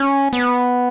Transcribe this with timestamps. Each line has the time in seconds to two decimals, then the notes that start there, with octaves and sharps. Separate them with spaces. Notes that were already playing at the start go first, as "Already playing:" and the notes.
Already playing: C#4
0.33 B3